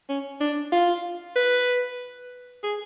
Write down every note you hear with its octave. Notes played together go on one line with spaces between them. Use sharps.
C#4
D4
F4
B4
G#4